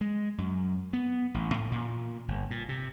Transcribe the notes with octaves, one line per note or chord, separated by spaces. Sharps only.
G#3
F#2
B3
A1
A2
A#2
G1
A#2
C3